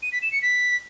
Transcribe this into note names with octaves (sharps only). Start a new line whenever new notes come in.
D#7
B6
E7
C#7
B6